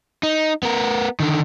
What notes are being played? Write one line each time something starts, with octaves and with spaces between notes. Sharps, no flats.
D#4
B3 A#4
D3 D#3